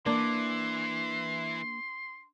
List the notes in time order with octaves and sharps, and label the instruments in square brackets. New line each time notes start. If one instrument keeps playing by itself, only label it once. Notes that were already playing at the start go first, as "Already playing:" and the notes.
[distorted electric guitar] E3 [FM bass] A#3 [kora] D4 [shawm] C6